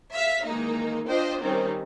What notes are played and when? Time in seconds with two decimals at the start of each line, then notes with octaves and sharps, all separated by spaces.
0.13 E5 F5 B6
0.45 D#3 E3 G#3 A#3 D#4
1.08 D4 F4 C5 D#5 G5
1.41 D#3 G3 C4 C#4 D#4